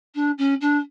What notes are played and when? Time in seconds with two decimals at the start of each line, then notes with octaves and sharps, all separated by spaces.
0.15 D4
0.38 C#4
0.61 D4